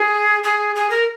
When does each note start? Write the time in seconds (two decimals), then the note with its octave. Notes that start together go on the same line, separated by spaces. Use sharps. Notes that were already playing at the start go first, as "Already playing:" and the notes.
Already playing: G#4
0.43 G#4
0.75 G#4
0.90 A#4